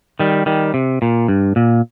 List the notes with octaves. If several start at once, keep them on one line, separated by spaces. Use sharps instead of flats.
D#3 G3
D#3 G3
C3
A#2
G2
A#2